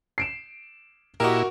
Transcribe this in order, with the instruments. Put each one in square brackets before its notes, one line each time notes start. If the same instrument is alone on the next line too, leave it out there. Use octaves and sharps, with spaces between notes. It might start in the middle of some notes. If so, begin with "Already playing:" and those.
[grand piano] C7 D7 E7
[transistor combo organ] A#2 E4 [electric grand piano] F#4 A#4 [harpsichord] G4 D#5